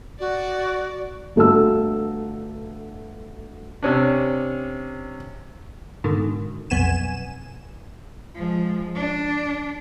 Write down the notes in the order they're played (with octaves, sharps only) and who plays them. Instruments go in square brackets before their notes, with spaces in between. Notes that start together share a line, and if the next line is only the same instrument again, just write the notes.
[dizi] F#4 [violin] D5
[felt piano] G1 A3 F#4 A5 E6
[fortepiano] C3 C#4 D4
[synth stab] G#2 B2 D3 D#3
B1 F2 B3 G#5 E7
[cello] F3 G#3
D4